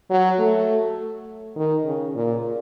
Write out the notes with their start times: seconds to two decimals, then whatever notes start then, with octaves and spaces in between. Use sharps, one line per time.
0.10 F#3
0.39 A3
1.56 D#3
1.85 C#3
2.15 A#2